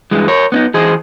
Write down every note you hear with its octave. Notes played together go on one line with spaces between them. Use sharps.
G2 E3 G#3
A#4 C#5
B3 C#4 D#4
E3 G#4 C5 D#5